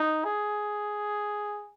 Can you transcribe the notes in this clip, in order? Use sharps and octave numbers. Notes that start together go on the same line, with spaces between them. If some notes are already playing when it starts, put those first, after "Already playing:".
Already playing: D#4
G#4